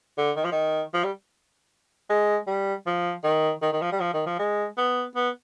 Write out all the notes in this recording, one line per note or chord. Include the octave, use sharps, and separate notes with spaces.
D3
D#3
F3
D#3
F3
G3
G#3
G3
F3
D#3
D#3
D#3
F3
G3
F3
D#3
F3
G#3
B3
B3